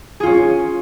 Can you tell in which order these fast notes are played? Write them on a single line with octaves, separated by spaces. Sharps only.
G#4 F4 C#4